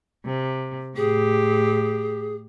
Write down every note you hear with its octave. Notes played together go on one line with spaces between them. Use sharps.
C3
A2 G4 G#4